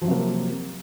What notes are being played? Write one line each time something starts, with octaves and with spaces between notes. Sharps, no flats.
C3 F3 F#3 A#3